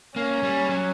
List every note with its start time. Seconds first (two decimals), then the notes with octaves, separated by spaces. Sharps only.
0.16 A#3 C#4
0.43 G3
0.69 F#3